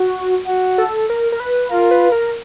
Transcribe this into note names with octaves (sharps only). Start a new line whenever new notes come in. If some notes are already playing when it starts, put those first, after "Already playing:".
Already playing: F#4
F#4
A4
A#4
A#4
B4
F4 A#4
B4
A#4